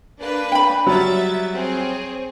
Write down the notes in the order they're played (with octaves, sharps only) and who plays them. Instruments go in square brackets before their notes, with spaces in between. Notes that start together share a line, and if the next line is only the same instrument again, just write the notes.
[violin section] A#3 D4 B4
[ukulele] G5 B5
[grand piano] F#3 G3 [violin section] E5 F#5 A6
[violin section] C4 G#4 C#5